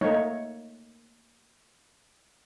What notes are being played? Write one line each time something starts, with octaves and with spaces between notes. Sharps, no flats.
A3 A#3 D#4 C#5